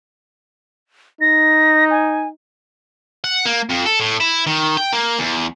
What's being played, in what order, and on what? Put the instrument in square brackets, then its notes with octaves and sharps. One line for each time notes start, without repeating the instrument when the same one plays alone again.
[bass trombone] D#4 [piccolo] A#6
[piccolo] G#5
[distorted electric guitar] F#5
A#3
F2
A4
A2
E4
D#3
G5
A#3
E2